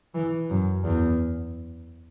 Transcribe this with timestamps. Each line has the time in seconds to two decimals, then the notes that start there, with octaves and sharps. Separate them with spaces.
0.15 E3
0.50 F#2
0.85 E2